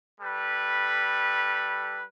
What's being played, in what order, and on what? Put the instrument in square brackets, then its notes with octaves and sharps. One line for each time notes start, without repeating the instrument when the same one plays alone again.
[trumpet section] G3 A4 B4